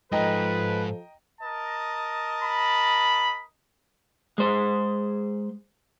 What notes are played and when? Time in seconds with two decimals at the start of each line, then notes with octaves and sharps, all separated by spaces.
0.12 G#2 F3 A4 B4 D#5 G5 A#5
1.42 A#4 D#5 A5
2.43 B5
4.38 G#3 G#4 C5